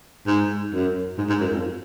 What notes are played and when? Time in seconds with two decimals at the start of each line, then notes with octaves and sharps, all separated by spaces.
0.27 G#2
0.73 F#2
1.18 G#2
1.29 G#2
1.41 F#2
1.52 F2